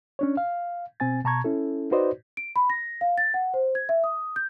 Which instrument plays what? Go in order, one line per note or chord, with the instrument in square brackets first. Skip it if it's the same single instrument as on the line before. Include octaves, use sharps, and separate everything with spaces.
[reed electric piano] C#4 D4 C#5
F5
B2 C4 G#5 A6
B2 A5 A#5 C#6 G#6
C#4 E4 A4
D#4 F#4 B4 C5 D5 D#5
[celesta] D7
B5
A#6
F5
A6
F#5
C5
G#6
E5
D#6
G6